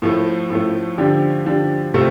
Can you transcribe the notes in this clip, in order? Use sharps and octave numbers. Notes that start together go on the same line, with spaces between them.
A2 F3 A3
A2 F3 A3
D3 F3 D4 G4
D3 F3 D4 G4
C3 A3 C4 F4